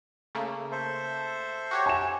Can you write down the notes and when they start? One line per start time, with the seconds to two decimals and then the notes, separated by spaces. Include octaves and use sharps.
0.35 C#3 A3 A#3
0.72 A4 C5 E5
1.71 F#4 G4 C#5
1.86 G#5 E7